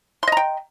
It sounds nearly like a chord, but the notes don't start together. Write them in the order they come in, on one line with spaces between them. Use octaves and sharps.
C6 D#5 A#5 G5